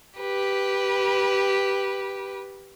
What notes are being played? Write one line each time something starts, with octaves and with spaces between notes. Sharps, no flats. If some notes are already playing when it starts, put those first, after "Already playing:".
G4 B4